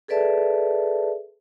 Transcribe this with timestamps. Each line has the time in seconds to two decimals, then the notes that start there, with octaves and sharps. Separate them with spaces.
0.08 G#4 A4 B4 D5 E5 A5